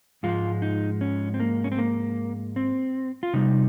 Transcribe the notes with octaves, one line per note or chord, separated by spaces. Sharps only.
G#2 F3 G#3 F4
D#4
C#4
C4
A#3
C#4
C4
A#3
C4
F4
C3 G3 D#4